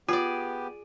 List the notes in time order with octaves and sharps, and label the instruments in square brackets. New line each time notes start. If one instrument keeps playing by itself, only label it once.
[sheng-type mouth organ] B3 G4 [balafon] F4 [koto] G#4 D5